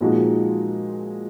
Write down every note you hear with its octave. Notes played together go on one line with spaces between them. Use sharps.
A#2 F3 G#3 D#4 F#4